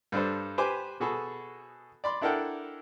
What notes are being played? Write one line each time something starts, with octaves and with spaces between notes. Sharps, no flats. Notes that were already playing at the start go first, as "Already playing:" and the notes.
G2 D4 A4 C5
G4 B4 C5 G#5 D6
B2 F#4 G#4 A4 B5
D5 B5 C6
D4 E4 A4 A#4 F#5 G5